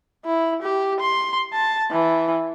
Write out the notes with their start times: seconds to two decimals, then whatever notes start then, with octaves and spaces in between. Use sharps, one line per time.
0.25 E4
0.62 G4
1.00 C6
1.53 A5
1.91 E3